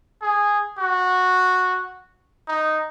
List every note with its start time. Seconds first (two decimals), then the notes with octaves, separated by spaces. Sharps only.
0.22 G#4
0.79 F#4
2.48 D#4